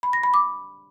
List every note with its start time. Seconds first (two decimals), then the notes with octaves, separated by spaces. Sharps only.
0.03 B5
0.13 A#6
0.23 B5
0.34 D6